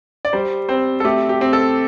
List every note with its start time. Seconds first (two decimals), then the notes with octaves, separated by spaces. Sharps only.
0.25 D5
0.33 G3 C5
0.69 C4 C5
1.00 A4
1.05 A3 G4
1.29 G4
1.41 C4
1.53 A4